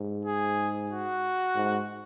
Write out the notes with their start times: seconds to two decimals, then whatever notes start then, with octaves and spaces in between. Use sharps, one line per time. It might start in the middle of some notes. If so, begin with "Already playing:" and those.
Already playing: G#2
0.25 G#4
0.90 F#4
1.55 G#2